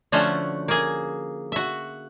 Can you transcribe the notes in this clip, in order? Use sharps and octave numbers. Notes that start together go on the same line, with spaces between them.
D3 F3 A3 C#4 F#4 C5
A#3 G#4
F#4 E5